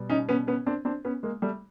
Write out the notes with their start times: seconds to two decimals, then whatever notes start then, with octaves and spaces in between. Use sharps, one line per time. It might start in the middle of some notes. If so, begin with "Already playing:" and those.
Already playing: B2 G3
0.10 C#4 D#4
0.29 B3 C#4
0.47 B3 C#4
0.66 C4 D4
0.85 C4 D4
1.05 B3 C#4
1.23 G#3 A#3
1.42 G3 A3